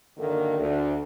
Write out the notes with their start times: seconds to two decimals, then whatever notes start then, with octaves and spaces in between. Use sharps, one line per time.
0.18 F#2 D3 D#3 A#3 A4
0.58 D2